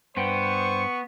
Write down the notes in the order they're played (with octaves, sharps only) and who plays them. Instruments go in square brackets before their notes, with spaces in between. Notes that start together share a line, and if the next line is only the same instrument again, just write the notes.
[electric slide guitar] G2 G5 [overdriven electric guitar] B3 [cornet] C5 [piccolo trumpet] C#6